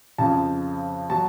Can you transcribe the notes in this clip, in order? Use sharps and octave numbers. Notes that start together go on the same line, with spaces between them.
F2 C#3 F3 A5
F#3 A5